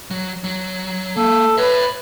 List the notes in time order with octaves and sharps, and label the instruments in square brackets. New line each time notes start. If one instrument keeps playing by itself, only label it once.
[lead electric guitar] F#3
F#3
[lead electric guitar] A#3 [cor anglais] A4
[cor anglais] B4 [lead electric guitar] C#5 E5